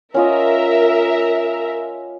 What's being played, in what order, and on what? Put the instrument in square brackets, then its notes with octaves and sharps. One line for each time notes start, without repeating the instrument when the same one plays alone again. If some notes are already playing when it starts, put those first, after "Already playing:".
[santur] C#4 F4 D#5 [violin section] A#4 E5